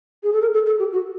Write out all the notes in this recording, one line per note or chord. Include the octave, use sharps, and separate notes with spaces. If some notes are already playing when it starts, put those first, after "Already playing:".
G#4
A4
A#4
A4
A4
G4
F#4